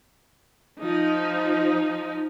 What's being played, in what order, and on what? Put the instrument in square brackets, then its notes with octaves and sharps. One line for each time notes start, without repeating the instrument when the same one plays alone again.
[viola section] F3 D#4